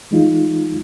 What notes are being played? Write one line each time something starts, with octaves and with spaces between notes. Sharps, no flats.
E3 G#3 D#4 F4